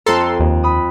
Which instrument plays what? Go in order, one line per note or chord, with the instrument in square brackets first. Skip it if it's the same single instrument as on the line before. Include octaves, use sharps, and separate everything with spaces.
[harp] F2 A#5 [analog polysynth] A4 C6
[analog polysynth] D#2
[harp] B5 D#6